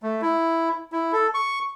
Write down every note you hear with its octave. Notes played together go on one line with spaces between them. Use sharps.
A3
E4
E4
A4
C#6